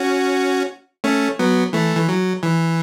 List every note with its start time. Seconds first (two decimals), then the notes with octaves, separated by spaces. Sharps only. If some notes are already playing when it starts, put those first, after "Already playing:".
Already playing: C#4 F#4
1.04 A3 C#4
1.39 F#3 B3
1.73 E3 A3
1.96 E3
2.09 F#3
2.43 E3